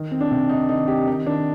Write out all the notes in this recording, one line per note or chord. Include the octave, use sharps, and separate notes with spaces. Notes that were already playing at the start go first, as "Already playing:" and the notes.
Already playing: D#3
C4
D4
C3
D#3 D#4
D#3 D#4
C4 G4
D#3 D#4
D#3 D4